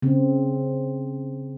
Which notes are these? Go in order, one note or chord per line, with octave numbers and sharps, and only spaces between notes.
C#3 C4